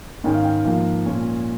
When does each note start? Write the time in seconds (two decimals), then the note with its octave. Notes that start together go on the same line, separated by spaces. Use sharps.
0.24 G#2 D#3 G#3 C#4 G5
0.34 F5
0.43 G5
0.65 G#2 F3 A#3
1.06 A#2 G#3 C#4